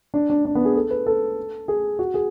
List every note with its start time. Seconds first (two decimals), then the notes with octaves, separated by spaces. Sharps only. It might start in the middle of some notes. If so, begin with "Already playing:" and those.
0.14 D4
0.30 D4
0.45 D4
0.55 B3
0.65 G#4
0.76 A4
0.90 B4
1.06 A4
1.68 G#4
1.99 F#4
2.14 G#4